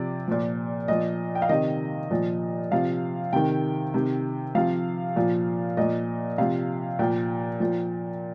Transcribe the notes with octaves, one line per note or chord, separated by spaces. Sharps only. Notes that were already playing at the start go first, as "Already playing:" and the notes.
Already playing: C3 F3 D5
A#2 F3
A#2 F3 D#5
G5
F5
C3 D#3 D#5
A#2 F3
C3 F3 F5
C3 D#3 G5
C3 D#3
C3 F3 F5
A#2 F3
A#2 F3 D#5
C3 F3 F5
A#2 F3 G5
A#2 F3